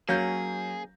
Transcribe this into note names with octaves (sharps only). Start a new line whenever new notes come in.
F#3 A#3 C#4 G#4 G6